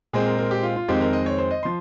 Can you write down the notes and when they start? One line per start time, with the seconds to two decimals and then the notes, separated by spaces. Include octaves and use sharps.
0.13 A#2 G#3 C4 G#4
0.26 A#4
0.38 A#4
0.51 G4
0.63 F4
0.76 F4
0.88 F2 D#3 G#3 C4 G4
1.01 A#4
1.13 D#5
1.26 C#5
1.38 C5
1.51 D#5
1.63 F3 C6